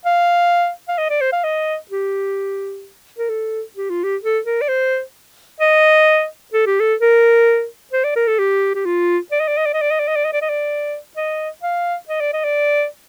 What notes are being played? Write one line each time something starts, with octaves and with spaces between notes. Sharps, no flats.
F5
F5
D#5
D5
C5
F5
D#5
G4
A#4
A4
G4
F4
G4
A4
A#4
D5
C5
D#5
A4
G4
A4
A#4
C5
D5
A#4
A4
G4
G4
F4
D5
D#5
D5
D#5
D5
D#5
D5
D#5
D5
D#5
D5
D#5
D5
D#5
D5
D#5
F5
D#5
D5
D#5
D5